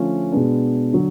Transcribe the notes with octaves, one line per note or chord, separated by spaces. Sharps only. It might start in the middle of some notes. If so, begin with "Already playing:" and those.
Already playing: D3 F3 A3 C#4 F4
B2 G#3 B3 D4
D3 F#3